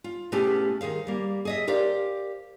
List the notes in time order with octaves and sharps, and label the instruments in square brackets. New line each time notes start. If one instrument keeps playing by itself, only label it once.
[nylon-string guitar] F4
B2 A3 C#4 E4 G4 G#4
D#3 G#4 C5 F5
G3 A#3
G#4 D#5 E5
G4 A#4 C5 D5 F5